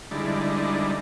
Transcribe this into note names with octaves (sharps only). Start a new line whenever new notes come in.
D3 G3 G#3 D#4 E4 D5